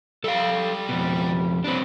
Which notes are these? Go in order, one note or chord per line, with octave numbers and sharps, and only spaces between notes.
G3 A4 E5 F5
F2 B2
C2 C4 D4 B4